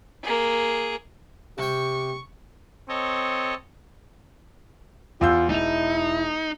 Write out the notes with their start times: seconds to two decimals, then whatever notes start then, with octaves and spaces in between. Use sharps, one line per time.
0.23 A#3 G#4
1.58 C3 G4 G5 C#6
2.89 C4 A4 C#5 D#5
5.21 E2 F4 E6 G6
5.50 E1 D#4 E4 F7